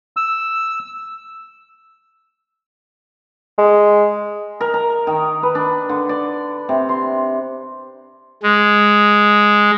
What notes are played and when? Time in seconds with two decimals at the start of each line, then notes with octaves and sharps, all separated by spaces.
0.17 E6
3.58 G#3
4.61 A#4
4.74 A#5
5.07 D#3
5.43 B4
5.55 D4
5.89 D3
6.09 D5
6.69 C3
6.89 C6
8.43 G#3